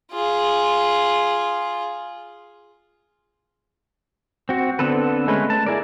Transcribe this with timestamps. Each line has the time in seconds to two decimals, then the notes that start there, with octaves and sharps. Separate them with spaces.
0.11 F4 G#4
4.49 C4 F#4
4.79 D3 B3 C4 A4 B4
5.28 G#3 A3 C#4 B4
5.50 A5
5.66 E4 G#4 A#4 D5